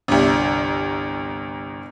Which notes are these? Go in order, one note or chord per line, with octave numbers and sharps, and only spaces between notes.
G1 C2